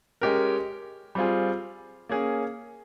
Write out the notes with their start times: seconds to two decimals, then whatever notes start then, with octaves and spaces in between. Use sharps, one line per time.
0.21 G#3 C#4 G4 A#4
1.15 G3 C4 F4 G#4
2.09 A#3 C#4 G#4